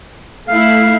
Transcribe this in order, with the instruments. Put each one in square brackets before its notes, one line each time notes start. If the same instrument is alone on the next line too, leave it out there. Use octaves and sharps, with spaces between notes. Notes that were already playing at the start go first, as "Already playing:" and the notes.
[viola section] A3 E4 [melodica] F5